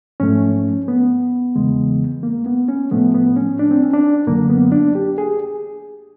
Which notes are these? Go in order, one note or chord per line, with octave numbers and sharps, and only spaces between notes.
G#2 F3 A3 C#4
B3
E2 C#3 E3 G#3
A#3
B3
C#4
A2 F3 A3 B3
B3
C#4
D4
C4
C#4
D4
F#2 D3 F#3 A#3
B3
D4
G4
G#4